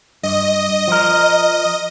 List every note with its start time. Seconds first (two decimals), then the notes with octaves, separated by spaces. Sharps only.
0.23 G2 D#5
0.88 F3 A#4